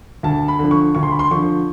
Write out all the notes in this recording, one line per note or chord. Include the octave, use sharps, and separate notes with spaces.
D2 A5
B5
D3 F3
C#6
D2 C#6
C6
B5
C6
D3 F3 C#6